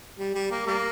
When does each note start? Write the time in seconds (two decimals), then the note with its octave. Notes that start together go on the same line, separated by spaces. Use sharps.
0.19 G3
0.35 G3
0.51 A#3
0.67 G3 A#3